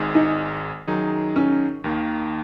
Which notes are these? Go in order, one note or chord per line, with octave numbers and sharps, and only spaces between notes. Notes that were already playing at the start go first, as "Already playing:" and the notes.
Already playing: G#1 G#2 G#3
D#4
F#2 D#3 F#3 D#4 G#4
C#4
D#2 D#3 A#3